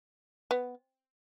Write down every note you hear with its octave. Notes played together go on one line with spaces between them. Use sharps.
B3